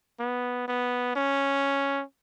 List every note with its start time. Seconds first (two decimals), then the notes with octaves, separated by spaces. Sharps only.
0.19 B3
0.68 B3
1.16 C#4